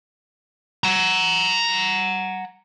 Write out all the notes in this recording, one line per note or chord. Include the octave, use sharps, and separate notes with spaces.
F#5 A#5